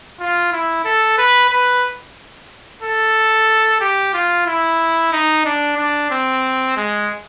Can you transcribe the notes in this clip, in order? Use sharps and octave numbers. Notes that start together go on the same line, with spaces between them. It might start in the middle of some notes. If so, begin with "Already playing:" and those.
F4
E4
A4
B4
B4
A4
G4
F4
E4
D#4
D4
D4
C4
G#3